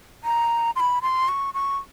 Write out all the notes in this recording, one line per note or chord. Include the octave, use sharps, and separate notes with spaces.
A#5
C6
B5
C6
C#6
C#6